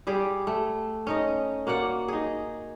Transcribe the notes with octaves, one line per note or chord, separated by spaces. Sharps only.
G3 G4 G#4
A3
C#4 D#4 D#5
A#3 F#4 D5 F#5
D#4 G#4